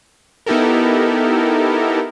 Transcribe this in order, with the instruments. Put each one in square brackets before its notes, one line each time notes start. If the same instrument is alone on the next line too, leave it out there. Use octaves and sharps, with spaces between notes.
[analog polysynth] B3 D#4 E4 G4 A4 A#4